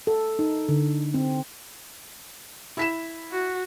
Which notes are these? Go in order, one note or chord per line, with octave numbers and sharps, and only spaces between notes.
A4
D#4
D3
C4
E4 B6 E7
F#4